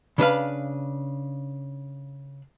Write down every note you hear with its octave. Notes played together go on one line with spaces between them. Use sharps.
C#3 D4 B4 F5